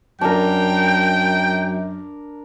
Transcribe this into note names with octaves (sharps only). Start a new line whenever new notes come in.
F#2 D4 A#4 G5